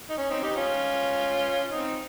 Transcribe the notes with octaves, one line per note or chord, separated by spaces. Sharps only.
D#4
C#4
C4 D#4
D#4 G4
C#4 F4
C4 D#4